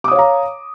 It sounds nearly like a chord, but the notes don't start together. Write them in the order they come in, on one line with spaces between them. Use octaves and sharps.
D6 D#6 C#5 F5 A#5